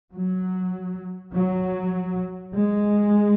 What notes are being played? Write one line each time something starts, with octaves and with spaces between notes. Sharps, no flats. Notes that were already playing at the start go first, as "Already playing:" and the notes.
F#3
F#3
G#3